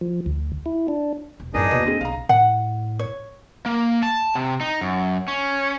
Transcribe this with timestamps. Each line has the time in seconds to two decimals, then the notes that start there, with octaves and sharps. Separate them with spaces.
0.01 F3
0.26 D2
0.66 E4
0.88 D4
1.40 E1
1.54 A1 F#2 C4 D4 D#4 G#4 A#4 D#5
1.71 D#2 B2 B4 D#7
1.85 G2 D3 C4 G#4
2.01 B1 F5 A#5
2.29 A2 F#5
2.99 C#5
3.66 A#3
4.03 A5
4.35 C3
4.61 D#4
4.81 F#2
5.28 C#4